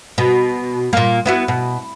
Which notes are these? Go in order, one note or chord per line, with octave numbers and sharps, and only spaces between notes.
B2
A#2 A#3
B3 E4 F#4
B2